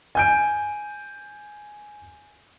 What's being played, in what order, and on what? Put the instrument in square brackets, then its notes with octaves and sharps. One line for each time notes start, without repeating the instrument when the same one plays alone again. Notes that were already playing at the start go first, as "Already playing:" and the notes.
[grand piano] G#5 G6 D7